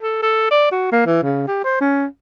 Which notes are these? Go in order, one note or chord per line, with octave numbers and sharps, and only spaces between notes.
A4
A4
D5
F#4
A#3
E3
C#3
G4
C5
C#4